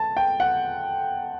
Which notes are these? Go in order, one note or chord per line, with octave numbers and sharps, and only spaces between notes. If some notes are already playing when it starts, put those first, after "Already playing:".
Already playing: A5
G5
F#5